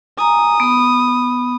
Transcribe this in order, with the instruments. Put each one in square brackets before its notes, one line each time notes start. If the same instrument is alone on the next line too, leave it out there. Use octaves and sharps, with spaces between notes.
[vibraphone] G#5 A#5 [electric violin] D#6
[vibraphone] B3 B5